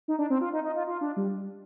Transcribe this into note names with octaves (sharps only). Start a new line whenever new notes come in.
D#4
D4
C4
F4
D#4
D#4
F4
F4
D4
G3